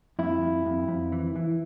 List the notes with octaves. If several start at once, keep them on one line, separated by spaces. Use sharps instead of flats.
F2 E4
F2
F2
F2
E3
E3